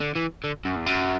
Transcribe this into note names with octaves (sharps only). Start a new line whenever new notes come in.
D3
E3
D3
F#2
E2
F#2